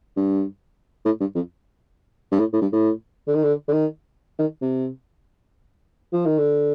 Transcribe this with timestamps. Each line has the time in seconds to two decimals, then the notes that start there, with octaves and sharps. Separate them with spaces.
0.17 G2
1.05 A2
1.20 G2
1.35 F2
2.32 G2
2.39 A2
2.53 A2
2.61 G2
2.72 A2
3.28 D3
3.35 D#3
3.44 D3
3.68 D3
3.72 D#3
4.39 D#3
4.61 C3
6.13 F3
6.26 D#3
6.39 D3